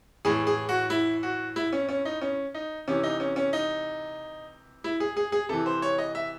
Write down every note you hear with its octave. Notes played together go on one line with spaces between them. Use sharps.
A2 E3 G#4
G#4
F#4
E4
F#4
E4
C#4
C#4
D#4
C#4
D#4
C3 E3 C#4
D#4
C#4
C#4
D#4
E4
G#4
G#4
G#4
C3 E3 A4
C5
C#5
D#5
E5